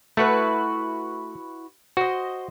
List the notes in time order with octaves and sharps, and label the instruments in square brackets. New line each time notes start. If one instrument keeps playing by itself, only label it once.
[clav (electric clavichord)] A3 [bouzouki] E4 F#4 B4
[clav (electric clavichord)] F#4 [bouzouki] C5 D#5